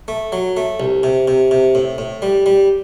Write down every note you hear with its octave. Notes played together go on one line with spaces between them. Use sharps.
A3
F#3
A3
C2
C3
C3
C3
A2
A2
G3
G3